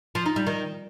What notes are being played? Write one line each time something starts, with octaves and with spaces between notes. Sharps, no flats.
F3
D#4
G3
D#3